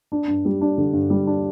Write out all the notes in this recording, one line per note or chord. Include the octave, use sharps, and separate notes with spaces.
D4
G2
G3
D4
D3
G2
G3
D4